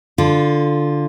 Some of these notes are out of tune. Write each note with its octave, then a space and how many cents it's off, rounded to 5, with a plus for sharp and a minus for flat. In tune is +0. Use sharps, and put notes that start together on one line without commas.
D3 +0 F4 +0